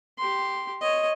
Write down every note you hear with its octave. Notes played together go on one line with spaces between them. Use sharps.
G4 C6
C#5 D#5